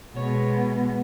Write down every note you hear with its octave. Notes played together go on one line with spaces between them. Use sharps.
B2 G#3 B3 C#5